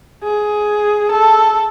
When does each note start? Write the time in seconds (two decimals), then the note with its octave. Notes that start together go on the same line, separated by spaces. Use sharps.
0.24 G#4
1.12 A4